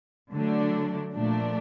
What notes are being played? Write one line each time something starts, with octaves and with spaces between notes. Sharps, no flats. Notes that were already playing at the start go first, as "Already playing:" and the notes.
D3 F#3 A3 D4
A#2 F3 A3 D4